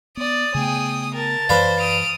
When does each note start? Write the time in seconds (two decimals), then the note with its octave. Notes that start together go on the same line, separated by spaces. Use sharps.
0.17 B3 D5 D#6
0.55 C#3 A3 B3 G#4 G5
1.14 A#4 A5
1.49 F#2 E3 B4 C5 D5 F5
1.80 D#6 F6 D7